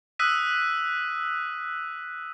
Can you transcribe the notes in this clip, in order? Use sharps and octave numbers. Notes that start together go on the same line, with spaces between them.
D#6 E6 F#6 B6 D#7